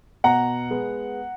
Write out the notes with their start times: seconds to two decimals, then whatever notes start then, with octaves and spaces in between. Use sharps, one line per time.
0.24 B2 F#5 A#5
0.71 G#3 B3